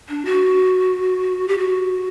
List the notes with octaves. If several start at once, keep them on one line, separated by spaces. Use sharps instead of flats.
D4
F#4
G4
F#4